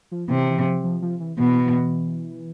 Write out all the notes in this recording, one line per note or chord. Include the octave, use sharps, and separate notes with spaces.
F3
C3 E3
E3
F3
F3
F3
E3
B2 E3
E3